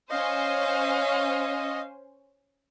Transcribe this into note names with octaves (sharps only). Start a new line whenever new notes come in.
C#4 C5 D#5 F5